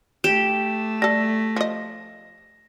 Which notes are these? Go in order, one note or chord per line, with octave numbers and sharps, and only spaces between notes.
A3 G4 E7
G3 A4 A#6
F3 D#5